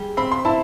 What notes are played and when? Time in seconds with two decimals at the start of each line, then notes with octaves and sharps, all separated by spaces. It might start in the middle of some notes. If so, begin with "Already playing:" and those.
Already playing: G3 G#4
0.17 C4 B5
0.32 C6
0.45 E4 A5 B5